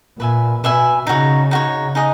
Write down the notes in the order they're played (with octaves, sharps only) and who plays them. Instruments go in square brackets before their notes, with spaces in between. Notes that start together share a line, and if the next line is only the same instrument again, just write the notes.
[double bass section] A#2 [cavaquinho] B4 E5 G#5
[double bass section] B2 [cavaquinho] B4 E5 G#5
[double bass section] C#3 [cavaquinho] D#4 F#4 C#5
[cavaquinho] D#4 F#4 C#5
D#4 G#4 D#5 F#5